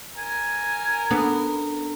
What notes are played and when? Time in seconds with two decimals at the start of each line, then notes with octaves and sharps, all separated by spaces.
0.18 A#4 G#5
1.11 B3 D4 A4